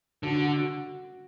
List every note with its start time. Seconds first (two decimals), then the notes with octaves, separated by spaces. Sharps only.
0.23 D3 F#4
0.47 F#4